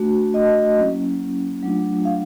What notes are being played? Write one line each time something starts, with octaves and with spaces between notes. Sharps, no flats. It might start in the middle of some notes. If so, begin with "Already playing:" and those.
Already playing: A3 D4 F#4
D#5
F#3 A#3 C#4 E4
F#3 A3 D4 F4
F5